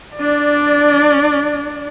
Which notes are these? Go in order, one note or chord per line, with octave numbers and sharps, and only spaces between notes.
D4 D5